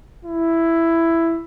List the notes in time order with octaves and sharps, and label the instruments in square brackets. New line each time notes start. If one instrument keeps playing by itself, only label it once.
[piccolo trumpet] E4